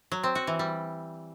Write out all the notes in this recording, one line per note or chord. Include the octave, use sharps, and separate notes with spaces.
F#3
C4
F#4
E3
G3